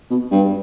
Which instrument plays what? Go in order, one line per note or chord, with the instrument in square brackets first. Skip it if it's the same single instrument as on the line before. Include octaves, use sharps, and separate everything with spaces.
[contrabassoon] B2
G2